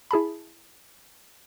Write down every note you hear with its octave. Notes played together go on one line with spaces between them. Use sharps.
E4 G#4 A5 B5